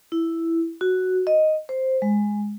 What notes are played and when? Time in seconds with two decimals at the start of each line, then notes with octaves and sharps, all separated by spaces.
0.12 E4
0.81 F#4
1.27 D#5
1.69 C5
2.02 G#3